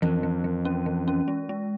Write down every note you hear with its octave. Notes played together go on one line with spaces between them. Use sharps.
F2 E3
E3
E3
C#4
E3
C#4
G#3
G#3